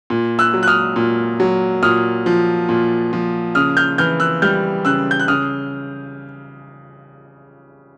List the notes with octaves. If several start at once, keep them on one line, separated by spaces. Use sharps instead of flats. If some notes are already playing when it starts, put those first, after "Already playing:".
A#2
E6 F#6
F#3
F#6
D#6 F6
A#2
F#3
A#2 D#6 F6
F3
A#2
F3
C#3 D#6 F6
F6 G6
E3 F6 G6
E6 F#6
G3 F6 G6
C#3 E6 F#6
G6
F#6
C#3 D#6 F6